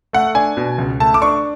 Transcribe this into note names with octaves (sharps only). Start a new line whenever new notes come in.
A3 F#5
D4 G#5
B2
C#2
A3 A5
D6
D4 C#6